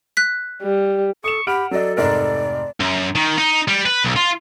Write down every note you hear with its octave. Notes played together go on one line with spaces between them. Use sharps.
F#6 B6
G3
A4 C#6 D#6 E7
G4 F#5 B5 F6 D7
F#3 A4 D5 D#5
F1 G#2 A#4 D5
F#2
D#3
D#4
G3
B4
B1
F4